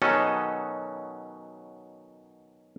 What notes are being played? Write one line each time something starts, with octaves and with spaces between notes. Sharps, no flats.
B2 D#3 F#3 C#4 A4 D#5